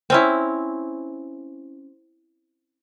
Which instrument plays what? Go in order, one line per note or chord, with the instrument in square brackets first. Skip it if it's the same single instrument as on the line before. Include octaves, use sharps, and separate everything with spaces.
[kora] C4 C#4 E4